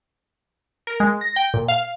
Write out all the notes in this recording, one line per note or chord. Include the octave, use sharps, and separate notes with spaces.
A#4
G#3
A#6
G5
A#2
F5